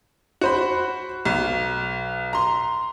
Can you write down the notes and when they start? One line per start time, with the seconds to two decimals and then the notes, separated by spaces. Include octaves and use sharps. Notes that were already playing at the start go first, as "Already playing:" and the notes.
0.41 F#4 C5 B5
1.25 B1
2.33 A#5 C6